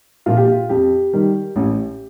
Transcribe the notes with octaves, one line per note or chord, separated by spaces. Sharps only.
A#2 F3 F4
G4
F4
F2 G4
D#3 G3
A1